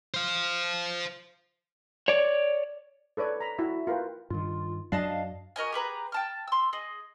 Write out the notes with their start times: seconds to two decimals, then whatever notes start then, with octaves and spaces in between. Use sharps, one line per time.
0.14 C5 F5
2.08 C#5 D5
3.17 A4 B4 C#5 D5
3.40 A#5 B5
3.58 E4 F#4 E5
3.87 F4 A#4 B4 G5
4.30 G2 D#3 F4
4.92 F#2 F#3 D4 D#5 F5 A5
5.56 F#4 A#4 D#5 G#5
5.72 G4 G#4 B4 A#5
6.12 G5 A5 F6
6.48 C6 E6
6.73 G#4 D#5